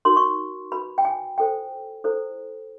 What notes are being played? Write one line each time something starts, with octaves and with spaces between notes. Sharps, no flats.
D#4 F#4 A#4 C6
C#6
F#4 B4 B5
G5
G#5
F4 A4 C5 G5
E4 A4 C5